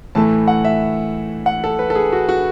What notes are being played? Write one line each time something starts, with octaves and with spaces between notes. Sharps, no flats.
A2 E3 A3 A5
F#5
E5
F#5
A4
B4
A4
G#4
F#4
F#4